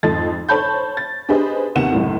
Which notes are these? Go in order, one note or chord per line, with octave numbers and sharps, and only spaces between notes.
F2 G#2 A4 D#5 A6
A4 C5 C#5 A5 B5 G6
A6
D4 G4 G#4 B4 C5 D#5
D#2 C3 B3 F#5 E7
C#2 F#2 A2